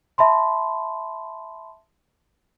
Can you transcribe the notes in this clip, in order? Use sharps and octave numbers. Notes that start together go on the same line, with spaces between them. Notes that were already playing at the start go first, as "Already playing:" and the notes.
E5 A5 B5 C6